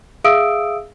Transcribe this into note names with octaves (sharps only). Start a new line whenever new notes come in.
G#4 E5 F5 D#6 E6 D7